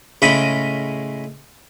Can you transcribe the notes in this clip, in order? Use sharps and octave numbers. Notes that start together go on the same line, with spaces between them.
A2 C#3 G#3 C#4 D#5 B5